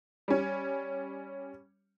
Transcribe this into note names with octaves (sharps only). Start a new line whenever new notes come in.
G3 C#4